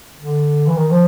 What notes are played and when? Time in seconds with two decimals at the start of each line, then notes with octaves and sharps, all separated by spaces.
0.17 D3
0.67 E3
0.76 D#3
0.91 F3